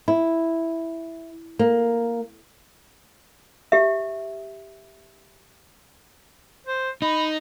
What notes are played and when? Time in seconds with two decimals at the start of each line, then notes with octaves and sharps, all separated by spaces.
0.08 E4
1.59 A#3
3.72 G4 E5
6.67 C5
7.02 D#4 B5